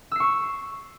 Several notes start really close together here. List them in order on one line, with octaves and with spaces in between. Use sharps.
E6 C7 C#6